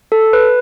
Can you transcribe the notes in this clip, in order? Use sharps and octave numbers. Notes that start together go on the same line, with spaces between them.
A4
B4